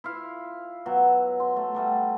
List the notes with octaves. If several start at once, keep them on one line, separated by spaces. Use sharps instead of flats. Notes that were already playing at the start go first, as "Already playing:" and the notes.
E4 F4 F5
B2 F#3
C6
A3
F#3 G3 A3